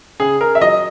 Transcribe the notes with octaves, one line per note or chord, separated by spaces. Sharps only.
C#3 G#4
A#4
E5
F#3 D#5